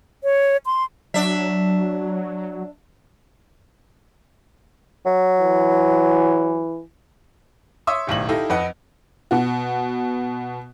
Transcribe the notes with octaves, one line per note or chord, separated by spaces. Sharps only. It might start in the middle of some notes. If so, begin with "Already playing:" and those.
C#5
C6
F#3 D4 E5
F#3
E3
C#5 E5 C6 C#6 D#6 E6
D#1 B1 A2 F#7
D#4 E4 G4 A4 F5
F2 B4 D#5 F#5
B2 F#4